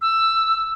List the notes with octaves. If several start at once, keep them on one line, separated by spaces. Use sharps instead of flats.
E6